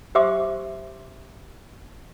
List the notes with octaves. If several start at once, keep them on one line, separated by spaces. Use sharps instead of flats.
G4 C5 E5 C6 D6